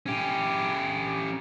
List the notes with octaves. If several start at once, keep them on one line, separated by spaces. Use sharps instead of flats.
C#4 G4